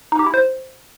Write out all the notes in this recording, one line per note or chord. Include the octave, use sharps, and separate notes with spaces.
D#4
G4
E4
C5